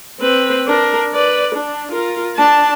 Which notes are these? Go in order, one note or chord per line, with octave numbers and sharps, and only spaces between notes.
C4 B4
D4 A#4
B4 D5
D4
F4 A#4
D4 A5